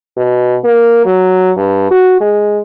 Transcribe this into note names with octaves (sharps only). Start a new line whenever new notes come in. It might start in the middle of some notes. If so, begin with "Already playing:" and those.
B2
A#3
F#3
G2
F#4
G#3